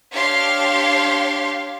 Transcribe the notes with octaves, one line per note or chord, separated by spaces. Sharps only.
D4 G4 C#5 F5 C6